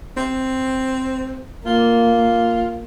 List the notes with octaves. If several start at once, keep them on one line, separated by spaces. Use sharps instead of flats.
C4
A#3 F4